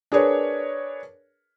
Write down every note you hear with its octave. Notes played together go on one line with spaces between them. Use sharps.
D4 G#4 A#4 B4 C#5